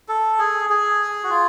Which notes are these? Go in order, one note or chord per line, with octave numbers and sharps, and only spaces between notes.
A4
G#4
G#4
F#4
F4